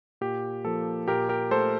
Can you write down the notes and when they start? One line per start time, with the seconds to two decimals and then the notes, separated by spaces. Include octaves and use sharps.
0.21 A#2 G4
0.65 F3 A#3 A4
1.08 A#2 G4 A#4
1.29 G4 A#4
1.51 A3 A4 C5